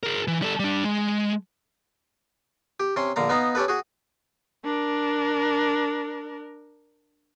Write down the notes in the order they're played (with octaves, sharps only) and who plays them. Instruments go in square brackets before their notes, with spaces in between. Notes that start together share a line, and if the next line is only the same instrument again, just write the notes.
[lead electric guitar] G#4 A#4
E3
G3 A4
G3 D4
G#3
[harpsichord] G4
C3 C#4 C6
A#1 D3 F5 A#5
B3 D#4 F5 A#5
C#4 G4 A4 B4
F#4 G#4
[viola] D4 A#4